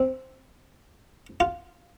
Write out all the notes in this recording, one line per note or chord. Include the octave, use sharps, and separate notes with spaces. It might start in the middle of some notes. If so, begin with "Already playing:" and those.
Already playing: C4
F4